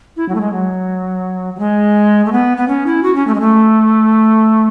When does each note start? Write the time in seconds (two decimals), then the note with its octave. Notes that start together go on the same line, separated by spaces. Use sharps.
0.17 E4
0.29 F#3
0.35 A3
0.41 G#3
0.53 F#3
1.55 F#3
1.59 G#3
2.26 A3
2.32 B3
2.57 B3
2.68 C#4
2.86 E4
3.03 F#4
3.15 C#4
3.27 A3
3.35 G#3
3.40 A3